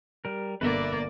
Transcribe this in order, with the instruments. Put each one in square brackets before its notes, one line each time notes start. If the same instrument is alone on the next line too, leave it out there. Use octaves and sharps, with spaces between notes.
[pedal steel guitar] G3 A#4
[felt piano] G1 B2 [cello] A#3 D5 [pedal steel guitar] B4 E5